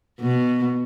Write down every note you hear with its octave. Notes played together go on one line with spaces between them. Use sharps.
B2